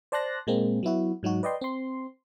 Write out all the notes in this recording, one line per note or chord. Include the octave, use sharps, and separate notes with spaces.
C5 D5 A5 C6 F#6 A#6
A#2 G#3 A#3 C4
F#3 B3 E4 F#4
G#2 F#3 D#4 F#4
B4 D5 D#5 G5 C6
C4 C6